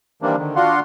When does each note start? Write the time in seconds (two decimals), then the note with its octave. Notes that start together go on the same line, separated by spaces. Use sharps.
0.22 D#3 E3 G3 A#3 C4 D4
0.37 D3 D#3
0.56 D4 F4 F#4 F5 F#5 C6